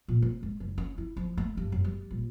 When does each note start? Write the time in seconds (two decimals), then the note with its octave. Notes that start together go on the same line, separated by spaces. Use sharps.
0.08 A#2
0.22 C4
0.43 G#3
0.60 F#1
0.78 C#4
0.98 E4
1.17 F3
1.37 A3
1.57 G2
1.72 F#2
1.84 G3
2.11 A#1